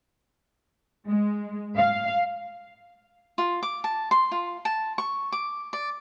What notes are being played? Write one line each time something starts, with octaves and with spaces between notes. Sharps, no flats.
G#3
F5
F4
D6
A5
C6
F4
A5
C#6
D6
D5